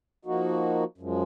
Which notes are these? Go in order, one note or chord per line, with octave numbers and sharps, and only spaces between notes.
F3 A#3 D#4 F#4
F#2 F3 G#3